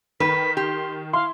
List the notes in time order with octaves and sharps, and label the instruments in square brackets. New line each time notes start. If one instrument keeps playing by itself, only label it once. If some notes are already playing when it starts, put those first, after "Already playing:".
[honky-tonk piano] D#3 [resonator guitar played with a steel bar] B4 [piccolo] B6
[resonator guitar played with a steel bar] G4 [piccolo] C6
[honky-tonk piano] E4 [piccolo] F5 [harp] C6